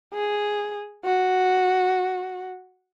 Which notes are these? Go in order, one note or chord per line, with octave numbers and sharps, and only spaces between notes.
G#4
F#4